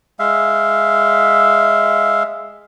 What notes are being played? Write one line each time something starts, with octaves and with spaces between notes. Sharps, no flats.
G#3 E5 F5